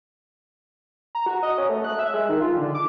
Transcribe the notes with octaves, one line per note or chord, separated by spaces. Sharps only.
A#5
F#4
D#5
C#4
A3
F#6
E5
G#3
D#3
F4
D3
D6